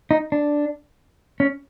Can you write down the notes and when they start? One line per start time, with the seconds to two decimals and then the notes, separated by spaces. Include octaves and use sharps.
0.11 D#4
0.32 D4
1.40 C#4